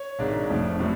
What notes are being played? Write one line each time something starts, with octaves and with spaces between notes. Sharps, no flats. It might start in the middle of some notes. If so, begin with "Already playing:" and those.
Already playing: C#5
G#1 G#2 G#3 D4
F1 F2 F3 A3
A2 F#3 A3 D4